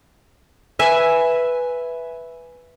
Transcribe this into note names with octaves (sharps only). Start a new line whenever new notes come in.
B4 E5 G#5